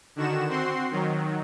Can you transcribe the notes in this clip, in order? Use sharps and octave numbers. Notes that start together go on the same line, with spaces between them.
D3 D#3 F#4 E7
C4 F#4 C6
D#3 F#3